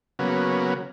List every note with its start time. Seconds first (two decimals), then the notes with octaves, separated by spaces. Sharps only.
0.19 C#3 F#3 A#3 B3